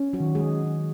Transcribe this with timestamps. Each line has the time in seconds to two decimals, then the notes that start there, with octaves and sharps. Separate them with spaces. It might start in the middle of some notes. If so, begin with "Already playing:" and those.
Already playing: C#4
0.13 F#3 F#4
0.20 D#3
0.35 G#3 G#4